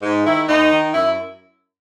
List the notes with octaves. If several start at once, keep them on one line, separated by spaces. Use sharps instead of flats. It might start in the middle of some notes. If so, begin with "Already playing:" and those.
G#2
D#3 E4
D#2 D#4
D#3
F#2 E4